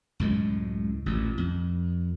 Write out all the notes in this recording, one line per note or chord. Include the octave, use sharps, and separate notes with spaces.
C#2 F#2 A2 G#3
A1 A#2
F2